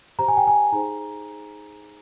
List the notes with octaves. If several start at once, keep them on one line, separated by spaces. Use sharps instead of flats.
G4 C5 A#5
G#5
G5
G#5
D#4 G#4 C5 A#5